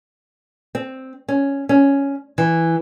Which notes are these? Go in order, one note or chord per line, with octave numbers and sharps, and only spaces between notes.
C4
C#4
C#4
E3